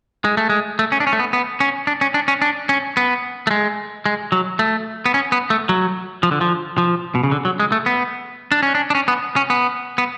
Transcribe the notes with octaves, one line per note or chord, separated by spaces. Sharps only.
G#3
A3
G#3
A3
C#4
D4
C#4
A3
B3
B3
C#4
D4
C#4
D4
C#4
D4
C#4
B3
A3
G#3
G#3
F#3
A3
B3
C#4
B3
A3
F#3
F3
D3
F3
F3
B2
C#3
D3
F#3
G#3
A3
B3
D4
C#4
D4
D4
C#4
B3
C#4
B3
B3